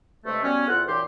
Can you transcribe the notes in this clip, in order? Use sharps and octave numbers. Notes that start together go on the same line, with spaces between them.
G2 C3 G#3 A3
F#3 G3 B3 C#4
E2 C3 F4 A4 F5 F#5
F#2 A#2 E3 D#4 G4 C6